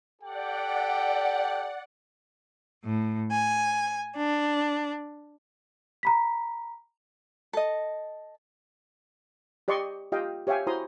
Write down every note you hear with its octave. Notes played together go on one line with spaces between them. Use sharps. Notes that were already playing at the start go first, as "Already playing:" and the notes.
G4 A4 D5 F#5 G5
A2
G#5
D4
A#5 B5 B6
A4 D#5
G4 D5 D#5 C6 C#6
F4 G4 D#5 F5 G5
G4 C#5 E5 F5 G5 G#5
E4 F#4 C5 A#5 C6 D#6